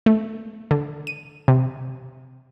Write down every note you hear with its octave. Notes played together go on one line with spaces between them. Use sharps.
A3
D3
D#7
C3